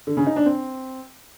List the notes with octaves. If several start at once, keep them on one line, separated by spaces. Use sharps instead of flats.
D3
C#3
D#4
D4
C4